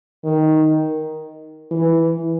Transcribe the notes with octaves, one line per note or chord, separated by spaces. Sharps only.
D#3
E3